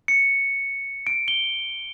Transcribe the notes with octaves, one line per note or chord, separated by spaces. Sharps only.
C#7
D7
G7